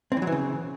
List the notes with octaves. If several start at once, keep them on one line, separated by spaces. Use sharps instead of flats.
C4
E3
F#3
E3
C#3